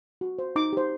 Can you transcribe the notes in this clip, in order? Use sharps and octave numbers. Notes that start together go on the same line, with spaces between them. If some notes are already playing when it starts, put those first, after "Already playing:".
F#4
C5
D#4 D6
G4 C5